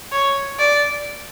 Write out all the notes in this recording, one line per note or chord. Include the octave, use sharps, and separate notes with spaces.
C#5
D5